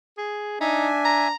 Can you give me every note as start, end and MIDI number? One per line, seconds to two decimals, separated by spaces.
0.18 0.60 68
0.61 1.31 62
0.61 0.88 63
0.61 1.28 76
0.61 1.28 80
1.05 1.34 82